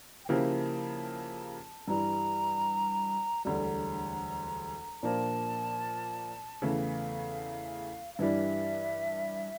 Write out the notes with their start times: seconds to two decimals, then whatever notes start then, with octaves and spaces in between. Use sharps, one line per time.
0.25 G5
0.29 C#3 F3 A#3 E4 G4 A5
1.87 G2 E3 G3 A#5
3.45 E1 D2 D3 G3 A#5
5.03 A#2 F3 A#3 D4 A5
6.62 E2 C#3 E3 A3 F5
8.14 F5
8.19 G2 E3 G3 D4 E5